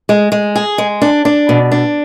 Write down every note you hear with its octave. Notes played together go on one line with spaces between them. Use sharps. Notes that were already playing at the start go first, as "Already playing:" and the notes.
G#3
G#3
G#4
G#3
D4
D4
B2
D4